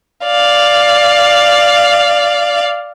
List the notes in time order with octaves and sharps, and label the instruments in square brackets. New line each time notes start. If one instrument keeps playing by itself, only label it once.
[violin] D5 F5